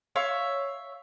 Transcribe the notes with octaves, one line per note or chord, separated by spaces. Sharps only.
C#5 E5 F5 C#6